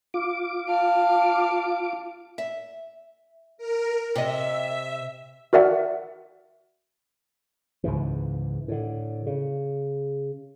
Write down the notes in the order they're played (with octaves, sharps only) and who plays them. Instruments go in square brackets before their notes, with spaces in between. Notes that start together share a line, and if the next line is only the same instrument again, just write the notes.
[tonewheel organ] F4 D6
[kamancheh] F5 A5
[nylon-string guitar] E5
[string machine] A#4
[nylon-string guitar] C3 D#5 [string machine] E5
[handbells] F#4 A#4 D5 E5 F#5
[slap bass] C#2 G#2 E3
A2 D3
C#3